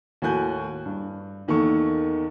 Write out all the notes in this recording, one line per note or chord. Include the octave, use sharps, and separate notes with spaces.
D#2 A2 F#4 G#5 F#6 G6
G2
E2 D#3 A#3 A4 C#6